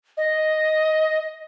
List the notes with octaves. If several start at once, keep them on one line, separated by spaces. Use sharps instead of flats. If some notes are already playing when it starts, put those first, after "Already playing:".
D#5